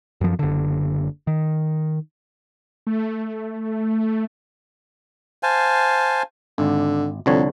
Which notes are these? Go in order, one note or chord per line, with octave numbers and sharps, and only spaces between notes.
F#2 F3
F#1 D3
D#3
A3
C5 F5 G#5 A5
G#1 D3
C2 F2 D3 C#5